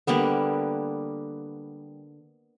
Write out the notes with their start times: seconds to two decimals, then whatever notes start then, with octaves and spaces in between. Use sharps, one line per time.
0.07 D3 G3 A#3 B3